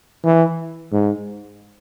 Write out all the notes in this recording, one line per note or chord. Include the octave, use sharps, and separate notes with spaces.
E3
G#2